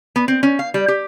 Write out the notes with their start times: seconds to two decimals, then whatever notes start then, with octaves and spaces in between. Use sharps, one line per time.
0.16 B3
0.28 C4
0.43 C#4
0.59 F5
0.74 G3
0.88 G4